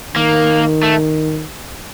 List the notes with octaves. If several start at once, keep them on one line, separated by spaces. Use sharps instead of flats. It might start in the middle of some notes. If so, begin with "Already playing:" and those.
D#3 A#3
A3